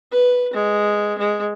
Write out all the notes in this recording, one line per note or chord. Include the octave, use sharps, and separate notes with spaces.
B4
G#3
G#3